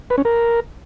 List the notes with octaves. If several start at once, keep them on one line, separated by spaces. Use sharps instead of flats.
B4
C#4
A#4